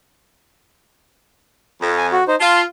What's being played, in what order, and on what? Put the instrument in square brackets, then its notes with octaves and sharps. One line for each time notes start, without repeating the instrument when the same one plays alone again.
[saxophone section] F2
[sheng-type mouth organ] G#5
F#4
D#4 C5
[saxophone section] F4 [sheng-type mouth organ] A5 C6